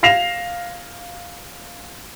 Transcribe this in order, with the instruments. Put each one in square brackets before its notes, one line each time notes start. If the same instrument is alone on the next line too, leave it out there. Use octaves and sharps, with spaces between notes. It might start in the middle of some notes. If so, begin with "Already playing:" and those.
[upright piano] F5 A#6 C7 E7 F7